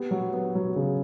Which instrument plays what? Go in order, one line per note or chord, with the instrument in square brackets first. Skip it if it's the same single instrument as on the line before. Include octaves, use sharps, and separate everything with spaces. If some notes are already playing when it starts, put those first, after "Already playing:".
Already playing: [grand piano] B3 G4
F#3
B3
F#3
C#3